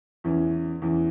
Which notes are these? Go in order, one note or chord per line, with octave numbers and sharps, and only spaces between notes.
E2 E3 C#4
E2 E3 C#4